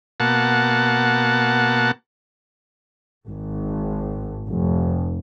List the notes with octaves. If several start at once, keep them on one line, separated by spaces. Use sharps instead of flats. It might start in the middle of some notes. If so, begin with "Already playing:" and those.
B2 A#3 F#5 A5
G#1
F1